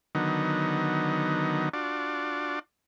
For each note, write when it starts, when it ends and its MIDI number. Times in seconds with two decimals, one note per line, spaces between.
0.15 1.69 50
0.15 1.69 51
0.15 1.69 54
0.15 1.69 59
0.15 1.69 63
1.74 2.59 62
1.74 2.59 65
1.74 2.59 66
1.74 2.59 74